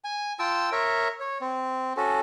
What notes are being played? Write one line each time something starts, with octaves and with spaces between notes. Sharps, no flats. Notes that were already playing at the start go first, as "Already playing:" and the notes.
G#5
F4 G5 A5 E6
A#4 C#5 E5
C#5
C4
C#4 F#4 A4